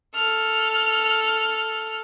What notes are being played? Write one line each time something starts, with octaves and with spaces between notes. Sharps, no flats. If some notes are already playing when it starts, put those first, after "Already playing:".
A4 F6